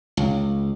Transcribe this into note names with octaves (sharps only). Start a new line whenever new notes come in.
C#2